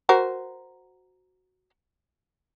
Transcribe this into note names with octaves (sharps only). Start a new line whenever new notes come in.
F#4 A#4 C5